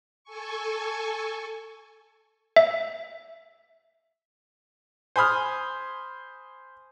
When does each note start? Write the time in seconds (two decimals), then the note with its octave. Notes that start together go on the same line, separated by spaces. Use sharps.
0.24 A4 G#5 C#6
2.56 E5
5.16 C5 G#5 B5 D#6 F6